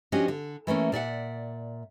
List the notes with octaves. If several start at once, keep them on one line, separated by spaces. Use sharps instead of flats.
F3 C#4 D4 F#4 G4 D#5
D3
E3 A3 A#3 C#4
A#2 D5 E5 F#5